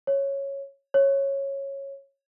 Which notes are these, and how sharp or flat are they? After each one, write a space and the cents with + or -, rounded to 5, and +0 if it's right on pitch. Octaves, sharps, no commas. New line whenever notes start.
C#5 -5
C#5 -10